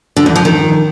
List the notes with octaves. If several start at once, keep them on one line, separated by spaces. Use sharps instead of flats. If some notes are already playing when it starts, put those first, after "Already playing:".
D3
E2
F3
D#3